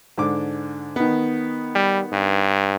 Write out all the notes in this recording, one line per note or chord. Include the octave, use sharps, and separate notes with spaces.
G#2 D3 D6
D#3 B3
G3
G2